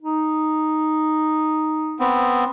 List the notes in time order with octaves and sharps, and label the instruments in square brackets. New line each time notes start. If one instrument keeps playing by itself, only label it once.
[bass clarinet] D#4
[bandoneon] B3 C4